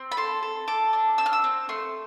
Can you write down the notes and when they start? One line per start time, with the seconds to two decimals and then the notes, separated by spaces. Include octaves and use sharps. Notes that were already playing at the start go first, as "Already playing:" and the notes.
Already playing: C4
0.12 B5
0.17 A4 C6
0.43 A4
0.68 A4 D6
0.93 D4
1.18 C4 E6
1.26 F6
1.33 E6
1.44 C4
1.69 A3 C6